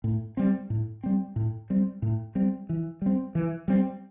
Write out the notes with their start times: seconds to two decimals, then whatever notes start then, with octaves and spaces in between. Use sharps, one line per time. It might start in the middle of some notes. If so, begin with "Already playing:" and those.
0.04 A2
0.37 G3 C4
0.70 A2
1.03 G3 C4
1.36 A2
1.70 G3 C4
2.02 A2
2.35 G3 C4
2.69 E3
3.02 G3 C4
3.35 E3
3.68 G3 C4